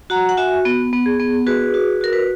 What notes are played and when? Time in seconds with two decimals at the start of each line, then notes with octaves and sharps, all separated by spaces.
0.10 F#4 F#5 A#5
0.29 F#5
0.37 F#4 E5 G#5
0.65 B3
0.93 B3
1.06 G#4
1.19 B3
1.46 F#4 G#4 B4
1.74 F#4
2.01 F#4 A#4
2.13 B4